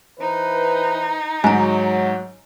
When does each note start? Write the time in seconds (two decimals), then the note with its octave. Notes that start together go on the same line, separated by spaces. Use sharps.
0.20 E3 D#4 B4 C5
1.44 G#2 F#3 G#5 A#5